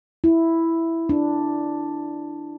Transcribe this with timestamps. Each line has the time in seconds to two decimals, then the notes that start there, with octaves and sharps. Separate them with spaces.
0.24 E4
1.09 D4